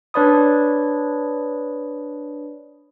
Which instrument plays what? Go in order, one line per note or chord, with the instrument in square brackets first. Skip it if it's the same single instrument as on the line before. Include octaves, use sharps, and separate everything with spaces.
[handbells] D4 B4 C#5 D5 B5 D#6